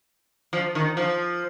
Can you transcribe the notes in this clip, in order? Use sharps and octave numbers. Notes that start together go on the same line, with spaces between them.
F3
D#3
F3